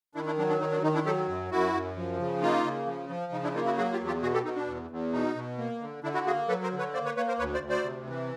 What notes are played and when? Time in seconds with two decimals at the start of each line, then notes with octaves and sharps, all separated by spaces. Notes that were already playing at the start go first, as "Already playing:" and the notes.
0.15 D#3 D4 E4
0.26 D4 E4
0.38 F#3 D4
0.49 D4
0.60 D#3 D#4
0.71 D4
0.83 D#3 D#4
0.94 D4 E4
1.05 F#3 G4 A4
1.28 F#2
1.51 F#2 E4 F#4
1.73 F#2
1.96 F3
2.19 C#3
2.41 A#3 D#4 F4
2.64 C#3
2.86 F3
3.09 F3
3.32 C#3 D#4
3.43 D4 E4
3.54 A#3 D#4 F4
3.66 E4 F#4
3.77 F#3 F#4 G#4
3.92 F4 G4
4.00 E2
4.07 F4 G4
4.22 B2 F#4 G#4
4.34 G4 A4
4.44 B2 D#4
4.56 D4
4.67 E2
4.90 E2
5.13 B2 D#4
5.36 B2
5.58 A#3
5.81 D3
6.03 D3 D4 E4
6.14 E4 F#4
6.26 A#3 F#4 G#4
6.48 F#3 A4 B4
6.63 A#4 C5
6.72 D3
6.78 B4 C#5
6.94 A#3 C5 D5
7.05 B4 C#5
7.16 A#3 B4 C#5
7.28 A#4 C5
7.39 D2 B4 C#5
7.54 C5 D5
7.61 D2
7.69 C5 D5
7.84 C3
8.07 E3